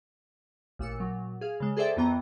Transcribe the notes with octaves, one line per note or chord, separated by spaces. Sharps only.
A1 A#2 E6 C#7
A#2 F#3
G#4 F5
C#3 G#3
G#4 A4 C5 D5 E5 G5
F2 E3 B3 G5 A#5